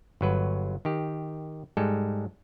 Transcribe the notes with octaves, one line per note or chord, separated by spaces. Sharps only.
G1 F#3 B4
D#3 G4
G#2 G3 G#3 A4